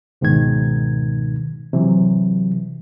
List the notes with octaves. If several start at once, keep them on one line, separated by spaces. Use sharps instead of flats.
C#2 G#2 B2 D#3 G#6
C3 E3 F#3